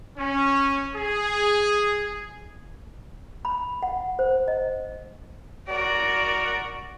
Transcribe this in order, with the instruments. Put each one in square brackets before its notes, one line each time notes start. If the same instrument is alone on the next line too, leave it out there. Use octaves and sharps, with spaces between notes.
[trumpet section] C#4
G#4
[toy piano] B5
F#5
C5
D#5
[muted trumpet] F#4 [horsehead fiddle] A#4 D5